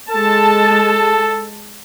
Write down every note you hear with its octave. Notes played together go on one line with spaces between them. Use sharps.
G#3 A4 A5